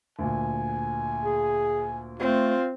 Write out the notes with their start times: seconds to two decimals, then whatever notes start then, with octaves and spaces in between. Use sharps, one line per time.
0.19 D2 A#2 G#5
1.24 G#4
2.20 A3 C4 F4